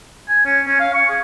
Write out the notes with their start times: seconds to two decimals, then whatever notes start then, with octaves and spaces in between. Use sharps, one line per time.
0.29 G#5
0.45 C#4
0.67 C#4
0.80 F5
0.94 C#6
1.09 G#4